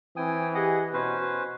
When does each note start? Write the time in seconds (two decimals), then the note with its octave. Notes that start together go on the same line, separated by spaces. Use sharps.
0.17 E3 C4 G5 G#5 D#6
0.55 G4 G#4 D#5 F#5
0.93 B2 C#4 B4 C5